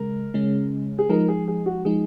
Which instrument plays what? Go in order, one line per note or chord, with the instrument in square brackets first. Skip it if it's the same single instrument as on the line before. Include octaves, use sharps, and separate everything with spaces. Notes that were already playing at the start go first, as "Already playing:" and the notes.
Already playing: [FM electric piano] C#3 G#3 [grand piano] A#4
[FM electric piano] C#3 G#3 C#4
[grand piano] G#4
[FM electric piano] F3 G#3 D#4 [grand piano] A#4
[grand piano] G#4
G#4
F#4
[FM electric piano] F3 G#3 D#4 [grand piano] G#4